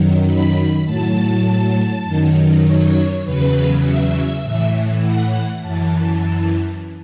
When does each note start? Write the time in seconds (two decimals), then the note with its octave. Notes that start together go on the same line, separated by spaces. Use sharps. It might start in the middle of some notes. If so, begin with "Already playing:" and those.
Already playing: F#2 D#3 F#3
0.26 B5
0.85 A2 F#3 A5
2.05 F#2 D#3 F#3
2.64 C#5
3.24 E2 C#3 F#3 B4
3.83 E5
4.43 A2 E3
5.02 F#5
5.62 F#2 E3 A5